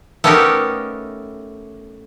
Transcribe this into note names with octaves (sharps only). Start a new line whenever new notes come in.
A3 B3 C#4 D#4 G4 A#4